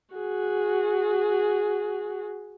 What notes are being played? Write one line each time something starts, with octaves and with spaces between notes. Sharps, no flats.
F#4 G#4